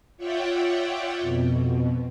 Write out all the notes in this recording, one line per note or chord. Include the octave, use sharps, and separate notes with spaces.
F4 C#5 D5 E5 F#5 G5
F2 B2